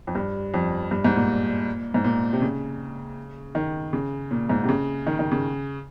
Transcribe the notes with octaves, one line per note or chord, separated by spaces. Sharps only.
F2
G2
F2
G2
G#2
A#2
G#2
A#2
C3
C#3
D#3
C#3
A#2
G#2
C3
C#3
D#3
D#3
C#3